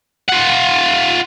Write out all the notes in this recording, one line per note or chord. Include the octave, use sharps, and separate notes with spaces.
F4 F#5